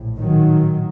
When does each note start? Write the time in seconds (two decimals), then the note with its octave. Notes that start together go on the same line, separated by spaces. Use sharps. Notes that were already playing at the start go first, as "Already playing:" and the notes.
Already playing: A#1 A2
0.17 D#3 F#3